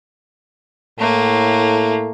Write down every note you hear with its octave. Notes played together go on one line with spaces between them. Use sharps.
A2 A3 A#3